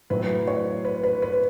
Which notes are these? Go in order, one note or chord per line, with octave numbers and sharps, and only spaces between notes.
A2 F#3 B4
C#5
B4
B4
B4